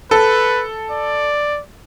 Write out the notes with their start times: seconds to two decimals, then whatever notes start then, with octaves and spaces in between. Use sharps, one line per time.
0.11 A4 B4
0.91 D5